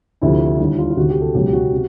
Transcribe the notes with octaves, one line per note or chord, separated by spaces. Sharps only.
D2 C3 F3 E4
D#2 D3 G3 E4
F4
F4
D2 C3 D#3 F#4
G4
A4
C#2 B2 F#3 G4
G4
F#4
C3